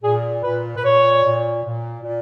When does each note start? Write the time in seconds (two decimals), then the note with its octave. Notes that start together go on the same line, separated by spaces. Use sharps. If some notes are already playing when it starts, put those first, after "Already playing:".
0.03 A#2 G#4
0.43 A#2 B4
0.76 B4
0.84 A#2 C#5
1.23 A#2
1.64 A#2
2.04 A#2